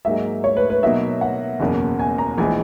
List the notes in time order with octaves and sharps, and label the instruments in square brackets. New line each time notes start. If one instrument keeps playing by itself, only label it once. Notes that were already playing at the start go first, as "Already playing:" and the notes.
[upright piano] G#2 F#3 A#3 D#4 G#4 [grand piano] E5
[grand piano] C#5
B4
B4
[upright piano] B2 F#3 A#3 D#4 [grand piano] E5
[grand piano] F#5
[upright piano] F#1 E2 B2 A#3 C#4
[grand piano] G#5
A#5
[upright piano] A#1 E3 G#3 [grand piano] G#5